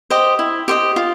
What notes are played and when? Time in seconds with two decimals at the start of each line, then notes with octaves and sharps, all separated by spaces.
0.10 G4 C5 D#5
0.39 E4
0.68 G4 C5 D#5
0.96 F4